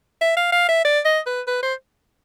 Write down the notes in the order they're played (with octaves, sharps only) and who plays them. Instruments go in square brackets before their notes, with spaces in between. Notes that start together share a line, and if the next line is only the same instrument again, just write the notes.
[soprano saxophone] E5
F5
F5
E5
D5
D#5
B4
B4
C5